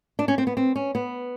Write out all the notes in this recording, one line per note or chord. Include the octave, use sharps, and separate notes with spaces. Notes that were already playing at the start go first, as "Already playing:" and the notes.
D4
C#4
C4
B3
C4
C#4
B3